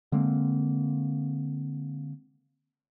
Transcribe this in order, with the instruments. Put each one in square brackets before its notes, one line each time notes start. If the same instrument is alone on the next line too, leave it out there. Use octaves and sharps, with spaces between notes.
[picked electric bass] D3 G#3 A#3 C4